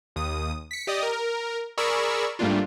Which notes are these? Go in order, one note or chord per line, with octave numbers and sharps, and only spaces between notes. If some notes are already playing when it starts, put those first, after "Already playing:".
D#2 D#6
B6 C#7
G4 D5 D#5 D#6
A#4
G#4 A#4 D5 B5 C#6 E6
G#2 G3 A3 A#3 D4 F4